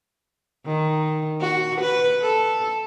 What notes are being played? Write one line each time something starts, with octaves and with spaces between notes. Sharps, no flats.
D#3
F#4
B4
A4